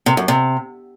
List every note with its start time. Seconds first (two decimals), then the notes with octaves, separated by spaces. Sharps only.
0.06 C3
0.17 F#2
0.28 C3